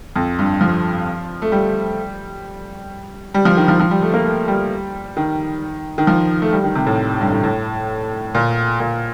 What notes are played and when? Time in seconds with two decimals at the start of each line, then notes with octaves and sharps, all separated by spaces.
0.16 F2
0.39 G2
0.61 F3
1.42 A3
1.52 G3
3.34 G3
3.45 F3
3.57 D#3
3.68 F3
3.80 F3
3.91 G3
4.02 A3
4.14 A#3
4.25 A3
4.48 G3
5.17 D#3
5.98 D#3
6.07 F3
6.42 A3
6.53 G3
6.64 D#3
6.75 C3
6.86 A2
7.21 G2
7.32 A2
7.43 A2
8.35 A#2
8.80 A#2